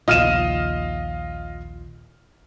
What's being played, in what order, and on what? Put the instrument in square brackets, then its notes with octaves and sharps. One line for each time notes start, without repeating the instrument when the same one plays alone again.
[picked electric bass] A#1 D#2 [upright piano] F4 E7 [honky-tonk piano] D#5 F6 D#7